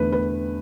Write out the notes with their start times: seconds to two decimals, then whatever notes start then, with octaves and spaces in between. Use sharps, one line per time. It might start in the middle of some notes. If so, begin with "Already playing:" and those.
Already playing: E2 D3 A3 B4
0.12 B4